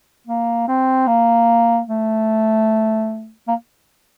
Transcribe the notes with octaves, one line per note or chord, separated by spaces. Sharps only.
A#3
C4
A#3
A3
A#3